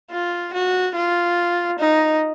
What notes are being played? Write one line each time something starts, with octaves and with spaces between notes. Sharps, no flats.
F4
F#4
F4
D#4